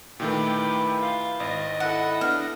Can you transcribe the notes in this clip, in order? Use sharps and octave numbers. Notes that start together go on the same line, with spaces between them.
A#2 D#3 A3 E4 G4 B4
F4
G#1 D#5
E4 A4 F#5
B3 D4 F6